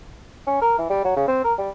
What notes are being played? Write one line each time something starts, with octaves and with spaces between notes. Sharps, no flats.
C#4
A#4
E3
G3
F#3
C#3
C4
A#4
G3